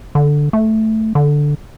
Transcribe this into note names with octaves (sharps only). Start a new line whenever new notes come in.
D3
A3
D3